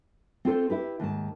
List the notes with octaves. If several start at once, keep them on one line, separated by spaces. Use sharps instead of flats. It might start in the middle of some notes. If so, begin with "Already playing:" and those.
C4 F4 A4 C5
E4 G4 B4
D#2 G#2 A5